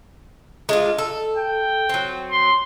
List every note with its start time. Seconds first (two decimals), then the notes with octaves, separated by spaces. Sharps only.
0.69 G#3 D4 F4
0.98 A4
1.37 G5
1.89 F#3 C4
2.31 C6